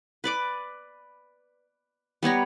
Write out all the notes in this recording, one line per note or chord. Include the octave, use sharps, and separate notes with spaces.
B4 D5 D6
G3 B3 C#5 A#5